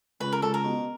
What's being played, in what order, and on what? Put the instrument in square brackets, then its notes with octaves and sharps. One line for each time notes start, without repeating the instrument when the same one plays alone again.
[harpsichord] C#2 [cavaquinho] B4
[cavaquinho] A#4
[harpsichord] C#2 [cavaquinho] A4
[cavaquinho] A#4
[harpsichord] B2